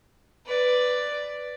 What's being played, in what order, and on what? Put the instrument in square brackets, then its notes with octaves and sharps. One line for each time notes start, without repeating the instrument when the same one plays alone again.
[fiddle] B4 D5